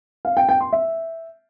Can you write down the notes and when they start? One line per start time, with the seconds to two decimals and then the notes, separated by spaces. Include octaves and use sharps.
0.25 F5
0.37 G5
0.49 G5
0.61 C6
0.73 E5